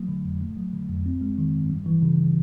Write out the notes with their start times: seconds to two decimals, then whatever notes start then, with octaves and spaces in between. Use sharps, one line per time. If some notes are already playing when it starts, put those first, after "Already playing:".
Already playing: F#3 A3
0.08 D3
0.25 F2
0.41 A3
0.57 F#3
0.73 D3
0.90 F2
1.06 C4
1.21 G#3
1.38 D#3
1.54 G2
1.70 G3
1.86 E3
2.02 C#3